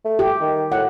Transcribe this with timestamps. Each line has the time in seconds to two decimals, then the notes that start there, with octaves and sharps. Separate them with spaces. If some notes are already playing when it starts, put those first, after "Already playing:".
0.05 A3
0.19 G4
0.41 D#3
0.72 A2 F#5